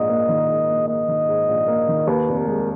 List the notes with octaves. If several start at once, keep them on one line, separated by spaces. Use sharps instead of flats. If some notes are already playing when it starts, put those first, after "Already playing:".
Already playing: A#1 G#2 D#5
A#3
D#3
G#2
A#1
A#3 D#5
D#3
G#2
A#1
A#3
D#3
D#2 B4
F1
A#4
G#3